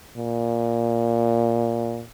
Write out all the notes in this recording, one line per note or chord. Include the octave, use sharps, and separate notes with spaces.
A#2